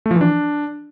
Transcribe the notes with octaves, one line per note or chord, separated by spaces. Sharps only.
A3
F3
E3
D4